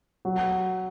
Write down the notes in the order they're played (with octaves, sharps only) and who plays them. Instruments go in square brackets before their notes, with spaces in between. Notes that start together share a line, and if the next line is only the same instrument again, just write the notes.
[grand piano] F#3